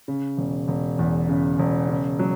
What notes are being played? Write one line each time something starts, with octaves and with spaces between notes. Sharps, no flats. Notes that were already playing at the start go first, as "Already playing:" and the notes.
C#3
E1
E1
E2
C#3
E1
C#3
F#3